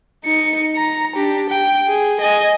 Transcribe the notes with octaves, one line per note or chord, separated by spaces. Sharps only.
D#4 C#7
A#5
D4 G4
G5
G#4
D#5 G#5